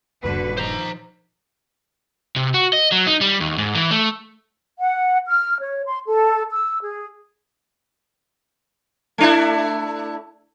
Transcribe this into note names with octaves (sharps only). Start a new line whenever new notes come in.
D#1 G2 D3 F#4 B4
D#3 F3 C5 A#5
C3
F#4
D#5
F#3
D#4
G3
D#2
G#2
E3
A3
F#5
F6
C#5
C6
A4
E6
G#4
A3 D4 E4